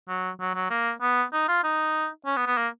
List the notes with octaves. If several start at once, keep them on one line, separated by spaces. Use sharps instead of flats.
F#3
F#3
F#3
A#3
B3
D#4
F4
D#4
C#4
B3
B3
A#3